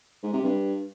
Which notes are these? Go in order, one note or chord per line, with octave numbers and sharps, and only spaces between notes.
G#2
C3
G2